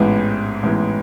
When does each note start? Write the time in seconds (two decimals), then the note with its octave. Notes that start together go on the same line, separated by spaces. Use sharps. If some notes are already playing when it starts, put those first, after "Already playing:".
Already playing: A1 G#2 E3 G#3 B3
0.63 A1 G#2 E3 G#3 B3